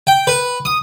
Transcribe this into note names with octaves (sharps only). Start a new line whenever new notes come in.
G5
B4
D#6